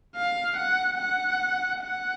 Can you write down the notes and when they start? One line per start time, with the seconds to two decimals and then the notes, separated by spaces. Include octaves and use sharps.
0.15 F5
0.57 F#5
0.99 F#5
1.81 F#5